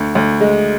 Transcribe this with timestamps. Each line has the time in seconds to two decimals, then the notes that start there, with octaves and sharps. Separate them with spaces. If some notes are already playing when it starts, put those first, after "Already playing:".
Already playing: D2
0.15 D2
0.41 G#3